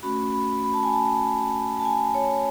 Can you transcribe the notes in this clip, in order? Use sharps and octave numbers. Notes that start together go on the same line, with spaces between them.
A3 C#4 F#4 B5
B5
B5
A5
G#5
A5
A5
G#5
C#5